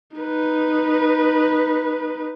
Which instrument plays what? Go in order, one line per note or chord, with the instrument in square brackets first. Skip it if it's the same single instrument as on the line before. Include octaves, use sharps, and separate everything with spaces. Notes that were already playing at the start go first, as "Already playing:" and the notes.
[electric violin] D#4 B4